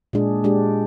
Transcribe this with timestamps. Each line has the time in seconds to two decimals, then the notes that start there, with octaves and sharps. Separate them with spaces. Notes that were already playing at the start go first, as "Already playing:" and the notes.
0.13 A#2 G#3 D4 G#4
0.44 G#3 D4 G4